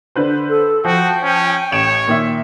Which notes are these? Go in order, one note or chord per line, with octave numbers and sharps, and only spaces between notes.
D3 B4 C5
A4
F3 F#4 G5
C#4
A1 C#5 D7 E7
A#2 D#3 E5